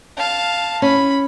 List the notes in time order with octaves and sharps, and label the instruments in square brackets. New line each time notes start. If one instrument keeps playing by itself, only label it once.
[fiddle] F5 A5
[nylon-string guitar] C#4 [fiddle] B5